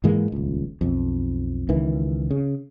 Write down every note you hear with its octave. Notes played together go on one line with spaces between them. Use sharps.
G#2 E3 G#3 A#3
D#1 C#2
B1 F2
C#2 D#3 E3
C#3